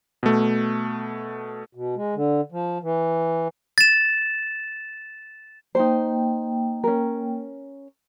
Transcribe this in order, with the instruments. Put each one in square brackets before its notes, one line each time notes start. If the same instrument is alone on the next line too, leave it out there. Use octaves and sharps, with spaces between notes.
[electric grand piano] B2 A3
[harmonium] B2
G#3
D3
F3
E3
[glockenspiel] A6 E7
[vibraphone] A#3 G5 [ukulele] D#4 C5
[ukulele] C#4 A#4